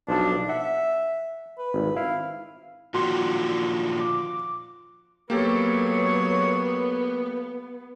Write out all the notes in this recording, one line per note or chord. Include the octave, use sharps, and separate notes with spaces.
B1 F3 D4 A4
E5 F#5
B4
G#1
E4 F5
A#2 D3 D#3 F3 F#4 C6
D6
F#3 A#3 B3 G4 A4 C#5